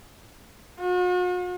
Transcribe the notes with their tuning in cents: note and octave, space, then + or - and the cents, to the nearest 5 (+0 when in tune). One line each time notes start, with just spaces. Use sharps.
F#4 -45